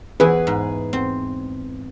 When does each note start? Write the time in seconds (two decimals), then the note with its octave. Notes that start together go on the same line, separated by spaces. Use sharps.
0.20 E2 E3 G#4 B4
0.47 G#2
0.93 C4